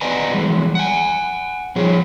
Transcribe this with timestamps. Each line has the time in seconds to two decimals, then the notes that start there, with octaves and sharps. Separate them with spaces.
0.01 B4 D5 D#5 F#5 G#5 A#5
0.34 E3 G3 G#3
0.75 F#5 G#5
1.76 F3 G3 G#4 C#5